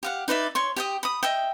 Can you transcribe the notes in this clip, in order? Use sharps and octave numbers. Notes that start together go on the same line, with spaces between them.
G4 F5 F#5
D#4 B4 D5 E5
C#5 C6 C#6
G4 G5 D#6
B5 D#6
D#5 E5 G5